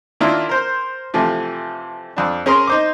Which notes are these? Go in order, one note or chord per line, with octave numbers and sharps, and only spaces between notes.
D#3 A#3 D4 E4 F4
A#4 C5
C3 E3 F3 A3
F2 D4
C#4 G#4 A#4 A#5 C6
D#4 C5 D6